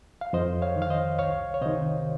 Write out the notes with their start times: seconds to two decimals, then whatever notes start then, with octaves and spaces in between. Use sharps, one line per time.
0.21 F5
0.33 F2 C5 D#5
0.62 C#5 F5
0.76 D#3
0.82 F5
0.90 C5 D#5
1.19 C2 C#5 F5
1.54 C#5
1.61 C3 D#3 C5 D#5